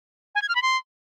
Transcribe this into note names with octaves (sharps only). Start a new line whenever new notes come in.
G#5
G#6
F6
B5
C6